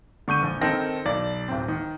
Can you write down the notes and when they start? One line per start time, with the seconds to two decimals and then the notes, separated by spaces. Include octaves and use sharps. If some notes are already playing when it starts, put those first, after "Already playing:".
0.28 D3 C#6 G6 D#7
0.42 A#1
0.61 D#3 C4 D#4 A4 A#4 A#6
1.06 B1 D5
1.48 D1 C4
1.68 D#3